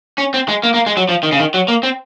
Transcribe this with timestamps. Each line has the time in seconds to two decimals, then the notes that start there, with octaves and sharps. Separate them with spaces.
0.18 C#4
0.34 C4
0.48 G#3
0.63 A#3
0.74 A#3
0.86 G#3
0.97 F#3
1.09 F3
1.23 D#3
1.32 C#3
1.39 D#3
1.54 F#3
1.68 A#3
1.83 C4